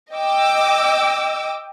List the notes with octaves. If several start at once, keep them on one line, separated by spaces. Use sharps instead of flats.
D#5 G5 D6 E6